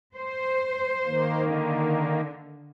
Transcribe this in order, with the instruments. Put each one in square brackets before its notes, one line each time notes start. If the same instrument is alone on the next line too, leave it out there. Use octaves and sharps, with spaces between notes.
[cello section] C5
[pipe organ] D#3 A#3
[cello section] D3